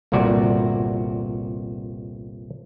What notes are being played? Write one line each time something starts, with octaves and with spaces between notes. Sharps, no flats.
G1 C2 A#2 F#4 D5